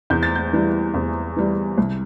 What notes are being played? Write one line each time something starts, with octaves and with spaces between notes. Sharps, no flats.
E2 G6
A6
G6
E3 G3
E2
E3 G3
C2